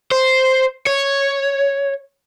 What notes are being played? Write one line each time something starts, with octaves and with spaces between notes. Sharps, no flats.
C5
C#5